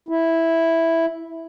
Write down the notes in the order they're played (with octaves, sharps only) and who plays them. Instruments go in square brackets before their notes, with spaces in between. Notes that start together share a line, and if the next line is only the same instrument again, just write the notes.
[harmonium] E4